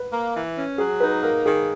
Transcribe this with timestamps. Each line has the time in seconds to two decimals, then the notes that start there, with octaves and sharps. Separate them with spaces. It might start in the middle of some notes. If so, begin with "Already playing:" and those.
Already playing: B4
0.11 A#3
0.34 E3
0.56 C#4
0.78 F#3 G#4
1.00 D#4 B4
1.23 A#3 A#4
1.46 D#3 G#4